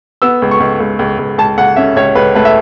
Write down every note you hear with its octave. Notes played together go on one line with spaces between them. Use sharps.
B3 E6
C#2
C#6
C#2
C#2
C#2
C#2
C#2 A5
C#2 F#5
C#4 E5
C#2 C#5
C#2 B4
A3 B4
E5